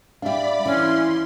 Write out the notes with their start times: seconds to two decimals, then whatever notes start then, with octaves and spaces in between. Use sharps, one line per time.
0.22 G3 D4 D5 E5 F5 B5
0.66 E3 C#4 C6